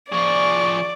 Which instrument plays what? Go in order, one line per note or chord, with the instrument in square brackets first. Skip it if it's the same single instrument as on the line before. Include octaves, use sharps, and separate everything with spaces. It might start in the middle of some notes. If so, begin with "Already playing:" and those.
[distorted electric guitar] F3 G#4 [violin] D5 [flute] C#6